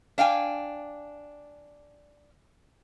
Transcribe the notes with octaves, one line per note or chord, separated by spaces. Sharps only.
D4 F5 G5 G#5